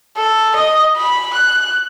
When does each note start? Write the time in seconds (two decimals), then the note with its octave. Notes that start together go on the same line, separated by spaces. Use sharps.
0.17 A4
0.56 D#5
0.97 B5
1.34 F#6